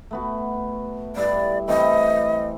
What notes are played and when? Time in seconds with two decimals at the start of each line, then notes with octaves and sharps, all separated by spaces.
0.11 A3 B3 F#4
1.16 G2 E4 D5
1.68 E3 A3 C4 D#5